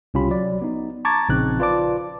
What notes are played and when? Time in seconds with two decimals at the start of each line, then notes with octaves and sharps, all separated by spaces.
0.14 C2 C#3 C#4 F4 G4 B5
0.30 F#3 D5
0.62 B3 D#4
1.05 A5 A#5 C#6 D6 G#6 A6
1.29 A#1 C#3 C4 D#4 F#6
1.60 F4 B4 C5 D5 A5 D6